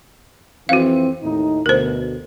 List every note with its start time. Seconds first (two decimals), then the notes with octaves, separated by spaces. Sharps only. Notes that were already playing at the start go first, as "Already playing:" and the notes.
0.69 F2 E3 C4 F#4 F5
1.22 D#2 A2 D#4
1.66 D2 B2 A#4 C5